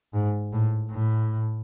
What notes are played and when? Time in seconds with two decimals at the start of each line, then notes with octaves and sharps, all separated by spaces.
0.14 G#2
0.53 A2
0.91 A2